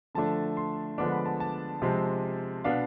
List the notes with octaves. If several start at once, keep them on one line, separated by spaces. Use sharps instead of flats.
D3 F3 A3 D4 A5
C6
D3 F3 G#3 B3 D4 D6
B5
A5
A5
C3 F3 G#3 C4
B2 B3 D4 F5